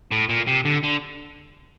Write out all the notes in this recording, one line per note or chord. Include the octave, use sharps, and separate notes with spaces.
A2
A#2
C3
D3
D3